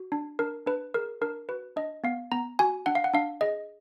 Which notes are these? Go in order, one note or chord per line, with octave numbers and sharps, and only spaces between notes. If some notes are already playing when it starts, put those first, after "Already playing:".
Already playing: F#4
D4
D4 A#4
D4 B4
G#4 A#4
D4 A#4
F#4 B4
D4 D#5
B3 F5
B3 A#5
F#4 G#5
D4 F#5
F5
F#5
D4 F5
G#4 D#5